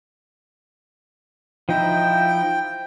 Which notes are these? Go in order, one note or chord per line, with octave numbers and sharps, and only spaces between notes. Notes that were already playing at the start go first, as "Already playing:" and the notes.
F3 D#4 E4 G5